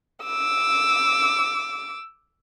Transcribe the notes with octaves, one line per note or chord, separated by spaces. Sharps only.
D6 E6